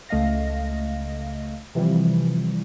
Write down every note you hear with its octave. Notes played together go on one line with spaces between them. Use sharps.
C#2 A3 D#5 F5 A#6
C3 E3 F3 G3